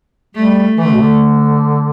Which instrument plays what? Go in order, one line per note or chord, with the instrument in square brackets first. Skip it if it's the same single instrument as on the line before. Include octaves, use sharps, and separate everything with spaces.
[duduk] G3 [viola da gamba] A3
[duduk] E3 [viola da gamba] A3
[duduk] D3
B2
D3